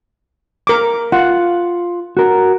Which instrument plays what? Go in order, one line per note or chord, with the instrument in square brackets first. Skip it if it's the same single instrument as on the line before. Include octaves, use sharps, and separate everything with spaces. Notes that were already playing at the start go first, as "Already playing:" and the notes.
[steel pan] A#4 D6
[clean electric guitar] F4 [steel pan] F#5
[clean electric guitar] F#4 A#4